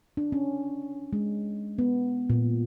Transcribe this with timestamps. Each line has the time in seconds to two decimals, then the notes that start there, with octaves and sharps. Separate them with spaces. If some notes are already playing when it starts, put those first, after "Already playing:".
0.17 D4
0.32 C#4
1.13 G#3
1.78 B3
2.30 A#2